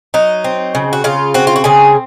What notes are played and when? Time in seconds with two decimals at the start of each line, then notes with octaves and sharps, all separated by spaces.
0.14 F#3 D#4
0.44 C4
0.75 C#3
0.93 F#4
1.04 C#3 F4
1.34 C4 F#4
1.47 F4
1.56 F#4
1.64 C#3 G#4